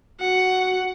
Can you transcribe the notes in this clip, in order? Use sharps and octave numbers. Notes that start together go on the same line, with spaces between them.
F#4 F#5